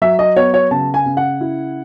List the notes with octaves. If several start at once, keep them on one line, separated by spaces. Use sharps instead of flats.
F#3 E5
D#5
B3 C#5
C#5
C#3 A5
G#5
C#3
F#5
E4